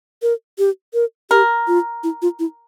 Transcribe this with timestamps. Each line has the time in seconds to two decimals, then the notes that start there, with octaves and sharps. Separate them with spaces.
0.22 A#4
0.59 G4
0.94 A#4
1.31 G4 A#4
1.67 F4
2.03 E4
2.22 F4
2.39 E4